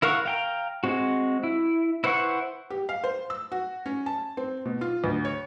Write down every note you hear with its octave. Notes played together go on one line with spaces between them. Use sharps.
E4 A#4 F5 F#5 C#6
F5 G5 A#5
G#3 C4 F#4
E4
E4 B4 C5 F#5 C#6
G4
F5
C5
E6
F#4
C#4
A5
C4
B2
F4
D2
C#5